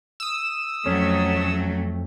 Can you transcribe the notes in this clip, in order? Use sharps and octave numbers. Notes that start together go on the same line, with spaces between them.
D#6 E6
F2 F#3 A3 C#4